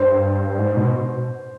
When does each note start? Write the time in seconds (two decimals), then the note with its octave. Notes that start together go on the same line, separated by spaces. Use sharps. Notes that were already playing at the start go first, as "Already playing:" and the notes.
Already playing: G2 C5
0.59 G#2
0.77 B2